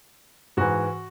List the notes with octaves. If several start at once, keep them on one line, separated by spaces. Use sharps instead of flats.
G#2 E3 F#4